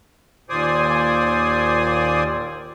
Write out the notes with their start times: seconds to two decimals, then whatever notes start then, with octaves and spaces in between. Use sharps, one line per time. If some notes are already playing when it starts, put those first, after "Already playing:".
0.50 D#2 A#2 C5 D5 G#5 D#6